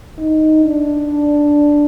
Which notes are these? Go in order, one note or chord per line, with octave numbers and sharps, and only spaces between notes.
D#4
D4